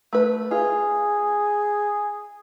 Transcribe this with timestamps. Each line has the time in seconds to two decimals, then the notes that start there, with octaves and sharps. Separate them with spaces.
0.13 A3 B4
0.51 F4 G#4